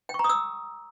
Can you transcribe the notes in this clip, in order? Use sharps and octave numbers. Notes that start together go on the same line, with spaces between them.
G5
C#6
A#5
D#6
E6